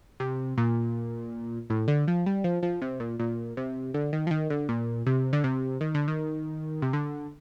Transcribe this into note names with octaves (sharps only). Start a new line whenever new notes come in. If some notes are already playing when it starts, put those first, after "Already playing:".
C3
A#2
A2
D3
F3
G3
F3
F3
C3
A#2
A#2
C3
D3
D#3
F3
D#3
D3
A#2
C3
D3
C3
D#3
D3
D#3
C3
D3